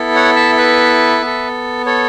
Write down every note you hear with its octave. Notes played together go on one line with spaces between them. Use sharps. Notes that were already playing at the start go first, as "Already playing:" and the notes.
Already playing: B3 E4 A4
C#5 F#5
E5 A5
B4 E5
B3 A4
A4 C#5